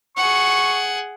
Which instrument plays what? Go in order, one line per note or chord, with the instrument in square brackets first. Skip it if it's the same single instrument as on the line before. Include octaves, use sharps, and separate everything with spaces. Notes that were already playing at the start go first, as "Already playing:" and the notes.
[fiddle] G#4 F#5 [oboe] C#6